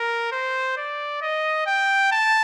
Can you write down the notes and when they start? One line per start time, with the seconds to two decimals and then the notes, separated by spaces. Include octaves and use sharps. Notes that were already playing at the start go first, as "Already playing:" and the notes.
Already playing: A#4
0.32 C5
0.77 D5
1.22 D#5
1.67 G5
2.11 A5